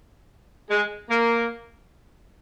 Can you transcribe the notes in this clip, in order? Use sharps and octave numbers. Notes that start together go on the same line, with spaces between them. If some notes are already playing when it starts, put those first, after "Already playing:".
G#3
A#3